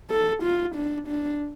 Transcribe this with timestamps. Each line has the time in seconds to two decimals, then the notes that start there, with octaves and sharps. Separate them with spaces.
0.10 A4
0.43 F4
0.75 D4
1.08 D4